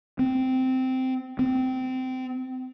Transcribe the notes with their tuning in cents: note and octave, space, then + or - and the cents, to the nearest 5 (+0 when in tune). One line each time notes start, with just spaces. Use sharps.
C4 -15
C4 -20